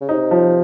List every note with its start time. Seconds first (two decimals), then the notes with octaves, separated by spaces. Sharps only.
0.01 C#3
0.09 C3 D#4
0.31 F3